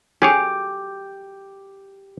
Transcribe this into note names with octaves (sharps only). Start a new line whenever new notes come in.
C#4 G4 G#4 C#5